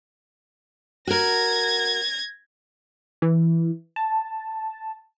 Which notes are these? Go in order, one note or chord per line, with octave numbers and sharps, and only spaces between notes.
F#4 A#4 G#6 A#6
E3
A5